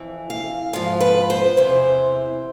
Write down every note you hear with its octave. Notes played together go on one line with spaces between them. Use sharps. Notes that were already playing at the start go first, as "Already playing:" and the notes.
Already playing: F2 E3
F5
G#2 F3 F5
B4
C5
E2 C3 E3